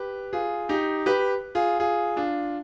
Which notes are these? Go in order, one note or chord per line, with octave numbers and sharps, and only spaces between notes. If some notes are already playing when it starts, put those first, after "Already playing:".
Already playing: G4 B4
F4 G#4
D#4 G4
G4 B4
F4 G#4
F4 G#4
D4 F4